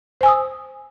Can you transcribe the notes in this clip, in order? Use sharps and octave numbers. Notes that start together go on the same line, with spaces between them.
C5 G#5 D#6 E6